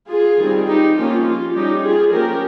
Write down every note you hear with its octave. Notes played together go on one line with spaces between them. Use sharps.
F4 G#4
D#3 G3 C4
D#4 G4
F3 A#3 C#4 F4
F4
G3 C#4 D#4 G4
F4 G#4
F3 A#3 C#4 G4 A#4